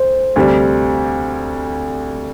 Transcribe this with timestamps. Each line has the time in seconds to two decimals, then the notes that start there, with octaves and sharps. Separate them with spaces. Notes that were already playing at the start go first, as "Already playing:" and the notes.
Already playing: D2 C5
0.36 D2 C3 G3